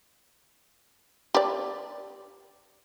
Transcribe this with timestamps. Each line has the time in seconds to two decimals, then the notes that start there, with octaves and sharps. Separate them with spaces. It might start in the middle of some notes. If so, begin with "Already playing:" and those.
1.35 G4 D5